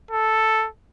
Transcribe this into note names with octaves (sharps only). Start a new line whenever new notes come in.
A4